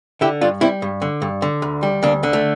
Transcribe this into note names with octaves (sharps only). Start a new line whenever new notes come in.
D3 E4 G4
G2 D4 F4
G3 C4 E4
G2
D3
G2
D3
D2
G3
D2 A#3 D4
D3
A3